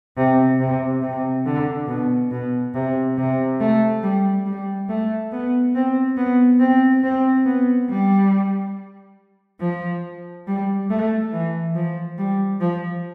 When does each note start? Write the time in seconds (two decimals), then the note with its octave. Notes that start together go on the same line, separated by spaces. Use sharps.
0.17 C3
0.59 C3
1.02 C3
1.46 D3
1.88 B2
2.31 B2
2.74 C3
3.18 C3
3.60 A3
4.02 G3
4.46 G3
4.89 A3
5.32 B3
5.75 C4
6.17 B3
6.60 C4
7.03 C4
7.46 B3
7.89 G3
9.60 F3
10.47 G3
10.90 A3
11.32 E3
11.75 F3
12.18 G3
12.61 F3